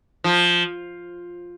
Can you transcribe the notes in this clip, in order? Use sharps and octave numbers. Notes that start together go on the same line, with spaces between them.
F3